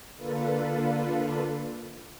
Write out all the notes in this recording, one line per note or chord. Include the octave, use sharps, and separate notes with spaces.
D3 A#3 D4 F4 A4 B4